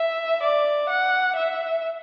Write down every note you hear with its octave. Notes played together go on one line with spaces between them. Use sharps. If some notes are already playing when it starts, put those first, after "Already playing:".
Already playing: E5
D5
F#5
E5